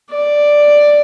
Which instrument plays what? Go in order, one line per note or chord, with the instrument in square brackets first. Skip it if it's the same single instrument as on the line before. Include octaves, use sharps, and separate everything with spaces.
[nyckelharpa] D5